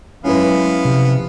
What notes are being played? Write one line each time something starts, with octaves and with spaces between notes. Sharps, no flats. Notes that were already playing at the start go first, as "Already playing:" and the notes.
F#2 G#3 B3 C#4 E4 B4 F5
C3 F3